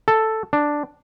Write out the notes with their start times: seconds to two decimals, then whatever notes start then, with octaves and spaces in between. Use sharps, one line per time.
0.08 A4
0.53 D4